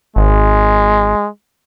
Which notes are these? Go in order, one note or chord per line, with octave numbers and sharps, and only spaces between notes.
G#1 G#3